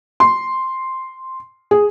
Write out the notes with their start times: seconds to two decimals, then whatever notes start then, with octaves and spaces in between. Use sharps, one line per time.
0.20 C6
1.71 G#4